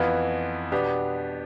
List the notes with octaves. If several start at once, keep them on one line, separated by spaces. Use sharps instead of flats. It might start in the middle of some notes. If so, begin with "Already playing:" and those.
Already playing: F2 E3 B3 F4
B2 B3 D4 G4